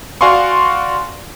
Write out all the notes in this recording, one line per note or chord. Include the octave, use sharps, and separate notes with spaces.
F#4 D5 F5 G#5 C6 C#6